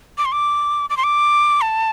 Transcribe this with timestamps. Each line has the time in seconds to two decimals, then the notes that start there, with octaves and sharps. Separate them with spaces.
0.18 D6
0.25 C6
0.32 D6
0.90 D6
0.97 C6
1.04 D6
1.61 A5